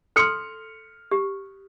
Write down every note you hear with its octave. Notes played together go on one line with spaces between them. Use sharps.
A4 C6 F6 C#7
G4